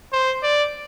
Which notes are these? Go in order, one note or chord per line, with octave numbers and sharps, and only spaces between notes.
C5
D5